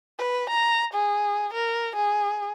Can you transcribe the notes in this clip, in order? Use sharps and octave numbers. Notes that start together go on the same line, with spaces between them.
B4
A#5
G#4
A#4
G#4